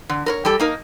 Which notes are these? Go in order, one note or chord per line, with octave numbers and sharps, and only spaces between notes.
D3
A#4 B4 C#5
G3 G4 A4
A#3 D#4 A#4